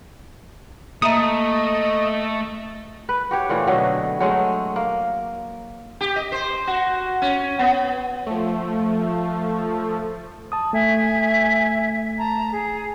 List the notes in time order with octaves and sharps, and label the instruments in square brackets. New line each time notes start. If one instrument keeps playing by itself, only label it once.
[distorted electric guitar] A3 [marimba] A#3 E5 A#5 [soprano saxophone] D#5 [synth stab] D#6
[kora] B4
F#4 G4 C#5
A#2 E3 A3
B2 D3 F#3 D#5
F#3 G#3 A3
A#3
[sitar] G4
D#5
C5
F#4
C#4
B3
[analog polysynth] F3 A3
[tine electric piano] A5 D#6
[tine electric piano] A3 [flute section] E5 G#5
[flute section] A5 A#5
G#4